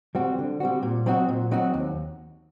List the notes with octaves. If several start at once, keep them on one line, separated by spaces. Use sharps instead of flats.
G3 C4 F#4
D3
G3 C4 F#4
A#2
F#3 C4 D#4 F#4
A#2
F#3 C4 D#4 F#4
D#2